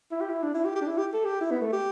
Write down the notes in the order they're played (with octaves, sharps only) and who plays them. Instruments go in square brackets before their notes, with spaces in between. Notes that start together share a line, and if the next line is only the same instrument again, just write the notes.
[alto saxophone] E4
G4
E4
D4
E4
G4
G4
D4
E4
G4
A4
G4
E4
B3
A3
G4